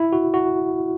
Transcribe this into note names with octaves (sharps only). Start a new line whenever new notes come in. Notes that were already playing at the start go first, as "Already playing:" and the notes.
Already playing: E4
F#4
F#4